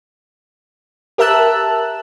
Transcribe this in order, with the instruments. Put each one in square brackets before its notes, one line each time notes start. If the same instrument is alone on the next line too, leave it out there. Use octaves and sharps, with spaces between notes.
[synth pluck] G4 A#4 E5 A5 E6 F#6